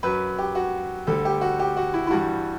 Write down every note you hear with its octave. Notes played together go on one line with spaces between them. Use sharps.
F#2 F#3 B4
G4
F#4
D2 D3 G3 A4
G4
F#4
G4
F#4
E4
E4
G2 E3 G3 F#4